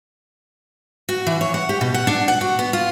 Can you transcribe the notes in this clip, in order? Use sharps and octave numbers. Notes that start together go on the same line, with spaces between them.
F#4
E3
C#5
F#5
G4
B2
F#5
D4
F#5
F#4
B3
F4